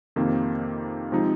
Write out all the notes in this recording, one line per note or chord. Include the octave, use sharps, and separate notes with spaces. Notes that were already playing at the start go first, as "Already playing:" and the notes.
F2 C3 D#3 A#3
C3 F3 G#3 D#4